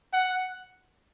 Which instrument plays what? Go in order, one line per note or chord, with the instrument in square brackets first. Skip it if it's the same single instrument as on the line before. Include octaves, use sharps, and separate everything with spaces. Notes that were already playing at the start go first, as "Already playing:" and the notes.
[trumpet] F#5